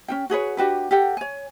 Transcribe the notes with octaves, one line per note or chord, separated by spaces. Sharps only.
C#4 F4 G5
F#4 G#4 B4 C#5
D4 F#4 G4 B4
G4 A4 F#5 G5
C#5 G#5